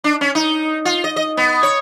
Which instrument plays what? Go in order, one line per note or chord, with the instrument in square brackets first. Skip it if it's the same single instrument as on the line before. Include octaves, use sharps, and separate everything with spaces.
[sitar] D4
C#4
D#4
F4
D#5
D#5
B3
C#5